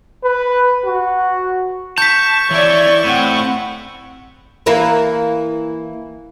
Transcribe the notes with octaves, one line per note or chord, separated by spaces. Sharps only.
B4
F#4
A5 C#6 G6 B6
E3 E4 C#5 D5
A2 C4 F#5
E3 A#3 E4